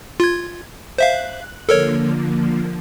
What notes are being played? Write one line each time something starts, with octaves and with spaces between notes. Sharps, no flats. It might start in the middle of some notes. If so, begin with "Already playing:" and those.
F4 G#6
C5 E5 F5 F#6
D3 F3 A#3 A4 A#4 C#5